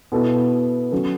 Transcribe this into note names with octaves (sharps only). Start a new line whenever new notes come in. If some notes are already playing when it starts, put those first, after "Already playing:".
B2 B3 E4 A4
F#3 C#4 A4